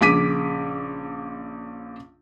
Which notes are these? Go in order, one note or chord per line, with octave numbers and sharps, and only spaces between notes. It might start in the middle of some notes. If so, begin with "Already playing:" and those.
A#1 C#3 D6 B6 D#7